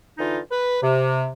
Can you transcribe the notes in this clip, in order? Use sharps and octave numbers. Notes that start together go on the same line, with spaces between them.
D3 E3 D#4 F4
B4
C3